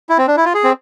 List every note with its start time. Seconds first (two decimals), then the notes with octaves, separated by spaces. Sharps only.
0.09 E4
0.18 C4
0.28 D4
0.37 E4
0.45 F4
0.54 G#4
0.64 C4